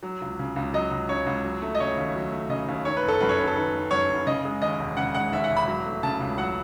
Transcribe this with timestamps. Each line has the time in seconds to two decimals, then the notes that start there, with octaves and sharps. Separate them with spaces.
0.03 F#3
0.21 C#2
0.39 C#3
0.56 C#2
0.73 F#3 D#5
0.91 C#2
1.09 C#3 C#5
1.26 C#2
1.45 F#3
1.62 A3
1.75 D#5
1.80 C#3 C#5
1.97 D#2
2.15 F#3
2.32 A3
2.50 C#3 D#5
2.68 D#2
2.85 D#3 C#5
2.97 B4
3.03 F#1
3.08 A4
3.20 F#2 B4
3.29 C#5
3.38 F#1 B4
3.48 A4
3.56 D#3 B4
3.74 F#1
3.91 F#2 C#5
4.10 F#1
4.26 C#3 D#5
4.45 G#3
4.62 D#2 D#5
4.79 E1
4.97 C#3 F#5
5.15 G#3 F#5
5.32 D#2 E5
5.44 F#5
5.49 E1
5.57 B5
5.68 F#3
5.85 A3
6.03 C#3 A5
6.21 C#2
6.38 F#3 F#5